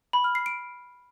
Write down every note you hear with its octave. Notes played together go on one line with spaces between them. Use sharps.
B5
F6
C7
D7